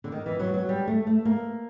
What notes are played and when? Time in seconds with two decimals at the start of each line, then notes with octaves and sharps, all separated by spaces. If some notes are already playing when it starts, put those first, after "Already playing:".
0.04 D3
0.12 D#3
0.26 E3
0.40 F#3
0.54 F#3
0.69 G3
0.87 A3
1.07 A3
1.25 A#3